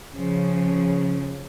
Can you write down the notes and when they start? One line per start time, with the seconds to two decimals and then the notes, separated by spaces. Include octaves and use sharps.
0.14 C#3 F3